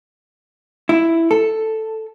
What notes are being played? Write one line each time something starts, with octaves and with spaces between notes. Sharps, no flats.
E4
A4